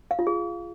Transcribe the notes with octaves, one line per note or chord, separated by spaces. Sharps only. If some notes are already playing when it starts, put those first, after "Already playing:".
F5
F4
G#4